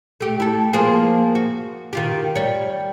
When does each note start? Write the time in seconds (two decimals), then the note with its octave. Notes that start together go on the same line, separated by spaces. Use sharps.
0.20 A3 G4
0.40 E4 A4
0.73 F3 A#3 G#4
1.35 F#4
1.93 D#3 F4 G4
2.35 G3 C#5